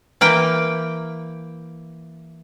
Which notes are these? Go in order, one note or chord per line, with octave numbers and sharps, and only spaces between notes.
E3 A#3 G5